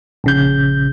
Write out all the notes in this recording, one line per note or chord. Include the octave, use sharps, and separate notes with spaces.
A#1 C#3 G6